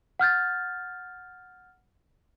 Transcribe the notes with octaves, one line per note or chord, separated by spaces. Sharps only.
F#5 F6 G6 A6